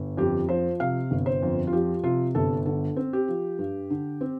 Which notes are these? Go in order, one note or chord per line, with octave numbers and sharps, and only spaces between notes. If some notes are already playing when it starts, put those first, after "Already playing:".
Already playing: G1
F2 G4
F3 C5
C3 F5
G1
C5
F2
F4
F3 G4
C3 F4
G1 A4
D3 A4
C4
G4
F3
G2
D3
C4